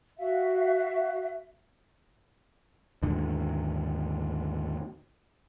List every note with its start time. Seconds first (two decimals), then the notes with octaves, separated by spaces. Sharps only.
0.18 F#4 E5 F5
3.02 D#2 G#2 D3